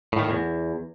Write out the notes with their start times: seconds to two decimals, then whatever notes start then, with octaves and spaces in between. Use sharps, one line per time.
0.13 A2
0.19 D#3
0.24 A2
0.30 E2